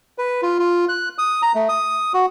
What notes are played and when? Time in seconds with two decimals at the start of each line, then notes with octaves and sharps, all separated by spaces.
0.18 B4
0.42 F4
0.59 F4
0.89 F#6
1.18 D#6
1.42 A#5
1.55 A3
1.69 D#6
2.14 F#4